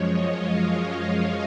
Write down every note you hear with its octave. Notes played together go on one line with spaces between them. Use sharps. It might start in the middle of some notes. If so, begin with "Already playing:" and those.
Already playing: F#2 F3 G#3 C#5 D#5
F5